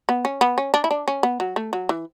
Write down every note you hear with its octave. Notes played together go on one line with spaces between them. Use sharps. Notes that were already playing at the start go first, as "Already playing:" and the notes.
B3
C#4
B3
C#4
D4
E4
D4
C#4
B3
F#3
A3
F#3
E3